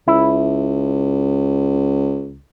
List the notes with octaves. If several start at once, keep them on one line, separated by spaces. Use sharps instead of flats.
C#2 E4